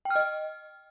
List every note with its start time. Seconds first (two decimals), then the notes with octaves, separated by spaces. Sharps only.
0.05 G5
0.10 F6
0.16 D#5